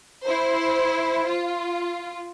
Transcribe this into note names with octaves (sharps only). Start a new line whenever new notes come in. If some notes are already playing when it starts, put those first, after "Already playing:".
E4 C5
F4